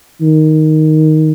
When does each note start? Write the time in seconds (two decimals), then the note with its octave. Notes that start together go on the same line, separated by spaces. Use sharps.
0.21 D#3